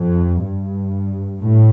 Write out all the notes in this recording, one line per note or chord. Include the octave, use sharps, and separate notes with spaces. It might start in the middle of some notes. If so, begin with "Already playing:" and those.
Already playing: F2
G2
A2